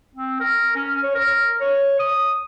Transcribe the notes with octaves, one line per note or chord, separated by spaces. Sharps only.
C4
A#4
C#4
C#5
A#4
C#5
D#6